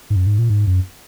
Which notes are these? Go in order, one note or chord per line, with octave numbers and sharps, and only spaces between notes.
G#2
F#2
G#2
A#2
G#2
F#2